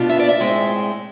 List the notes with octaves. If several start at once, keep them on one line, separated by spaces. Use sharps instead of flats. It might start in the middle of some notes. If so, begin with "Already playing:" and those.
Already playing: B2 B3 D4 F4
E5
D5
E5
A2 G#3 C4